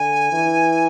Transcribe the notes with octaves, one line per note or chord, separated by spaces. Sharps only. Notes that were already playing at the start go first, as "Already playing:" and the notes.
Already playing: D3 G#5
E3